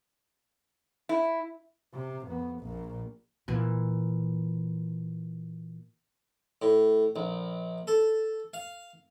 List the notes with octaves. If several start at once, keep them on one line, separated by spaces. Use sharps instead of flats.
E4
C3
F2 B3
A#1 A#2
A#2 E3
A2
A#1
A4
F5